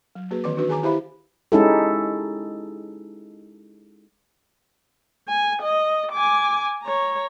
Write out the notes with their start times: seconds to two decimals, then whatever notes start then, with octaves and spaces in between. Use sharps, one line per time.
0.15 F#3
0.31 A#3 F#4 G#4 B4
0.44 D#3 E3 C4 B4 D6
0.57 D4 D#4 F#4 B4
0.69 D#3 G#4 G#5 A#5 D6
0.83 E4 G4 C5 E5 F5 B5
1.52 G#3 C#4 D#4 E4 G4 A4
5.29 G#5
5.63 D#5
6.12 G#5 D6
6.83 C#5 A#5